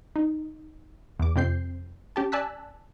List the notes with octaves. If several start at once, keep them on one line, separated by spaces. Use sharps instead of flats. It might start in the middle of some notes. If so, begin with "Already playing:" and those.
D#4
E2 D6
F2 C3 C4 G6 C7
C#4 G4 A5
D5 G#5 A5 E6 F#6 B6